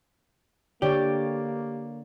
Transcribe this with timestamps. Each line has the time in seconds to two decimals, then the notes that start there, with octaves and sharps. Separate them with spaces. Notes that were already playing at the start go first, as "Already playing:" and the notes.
0.82 D3 A#3 G4 C#5 D5